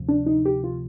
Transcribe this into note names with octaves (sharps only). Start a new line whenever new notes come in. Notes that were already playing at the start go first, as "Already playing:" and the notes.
Already playing: D2 C3 F3
D4
D#4
G4
F4